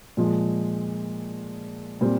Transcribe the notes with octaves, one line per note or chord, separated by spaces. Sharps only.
A#2 F3 G#3
A#2 G3 C4